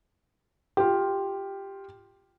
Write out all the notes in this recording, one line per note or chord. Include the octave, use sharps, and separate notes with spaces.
F4 G4